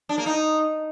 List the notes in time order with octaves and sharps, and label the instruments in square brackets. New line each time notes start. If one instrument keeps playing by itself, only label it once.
[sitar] D4
A#3
D#4